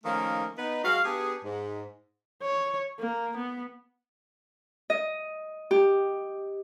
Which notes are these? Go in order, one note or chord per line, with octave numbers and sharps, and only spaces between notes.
D#3 F3 A3 A#3 C#4 D#4
B3 D#4 B4
F#3 G#3 F#4 F5
B3 D4 G4 G#4
G#2
C#5
A#3
B3
D#5
G4